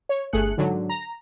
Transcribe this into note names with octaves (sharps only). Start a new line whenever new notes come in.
C#5
G1 A3 G#4 F#6 C#7
G#2 D3 F#3
A#5